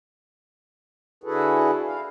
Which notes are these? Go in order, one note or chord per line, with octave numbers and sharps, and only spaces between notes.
D3 E4 F#4 G#4 A4 B4
F5